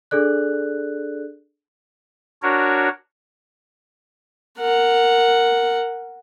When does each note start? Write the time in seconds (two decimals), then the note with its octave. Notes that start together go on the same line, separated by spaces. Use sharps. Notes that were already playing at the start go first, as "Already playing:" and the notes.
0.11 D4 G#4 A4 D5 F#6
2.43 D4 F#4 A#4 C#5
4.59 A#4 F#5